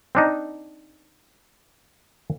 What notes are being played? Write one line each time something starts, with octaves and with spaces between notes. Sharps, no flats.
C4 D4 D#4